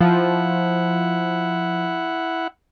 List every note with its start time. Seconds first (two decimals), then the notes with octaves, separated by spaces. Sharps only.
0.01 F3 E4 F#5